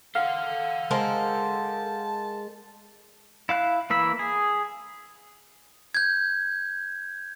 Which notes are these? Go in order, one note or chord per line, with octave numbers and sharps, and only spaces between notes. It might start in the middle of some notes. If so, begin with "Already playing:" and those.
A4 F5 F#5
G#3 A#4 C5 A5
E4 F5 F#6
E3 A#3 B5 E6
G#4
G6 G#6